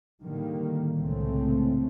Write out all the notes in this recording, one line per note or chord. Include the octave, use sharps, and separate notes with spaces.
A2 D3 D#3 G3 A#3
C2 A2 C#3 G#3 A3 C4